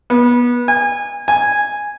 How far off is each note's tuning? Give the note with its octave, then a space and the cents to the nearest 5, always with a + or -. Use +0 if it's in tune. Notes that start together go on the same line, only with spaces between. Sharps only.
B3 -25
G#5 -25
G#5 -5